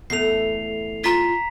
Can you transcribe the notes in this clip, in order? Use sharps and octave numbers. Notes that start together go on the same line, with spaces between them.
E2 A3 C7 F7
F4 A#5 B6